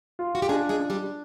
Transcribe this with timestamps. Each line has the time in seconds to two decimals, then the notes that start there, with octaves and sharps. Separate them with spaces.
0.19 F4
0.35 F#4
0.42 G4
0.49 G#3 D4 G#4
0.69 G#3 G#4
0.80 D4
0.90 G3 G4